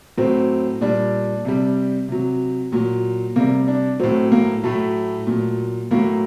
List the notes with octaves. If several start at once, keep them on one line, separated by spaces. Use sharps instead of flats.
A2 F#3 C4
A#2 G3 D4
C3 G3
C3 F#3
A#2 F#3
C3 G3 A#3
D4
A2 F#3 C4
A#3
A2 F#3 A3
A#2 F#3
A2 F#3 A#3